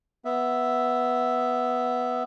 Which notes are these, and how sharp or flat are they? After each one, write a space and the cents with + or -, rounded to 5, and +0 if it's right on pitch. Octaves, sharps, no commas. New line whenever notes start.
B3 +0 E5 +0